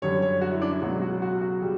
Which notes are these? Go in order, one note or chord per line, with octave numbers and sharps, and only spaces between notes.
F#2 D3 G3 C#5
C#5
F#4
E4
D4
E4
C#2 B2 F#3 F#4
F#4
F#4
F#4
C#3 G3